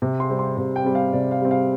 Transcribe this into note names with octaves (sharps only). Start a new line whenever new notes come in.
C3
C6
G3 C4
C6
C3
G5
G3 C4
F5
C3 D5
F5
G3 C4
F5